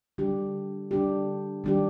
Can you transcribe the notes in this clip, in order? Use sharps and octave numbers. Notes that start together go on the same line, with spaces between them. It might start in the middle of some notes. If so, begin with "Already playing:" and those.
D3 G3 D4 G4
D3 G3 D4 G4
D#3 G3 D4 G4